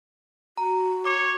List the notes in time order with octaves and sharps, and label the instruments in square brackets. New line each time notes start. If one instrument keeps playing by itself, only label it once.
[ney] F#4 [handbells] A#5
[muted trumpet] C#5 [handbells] D6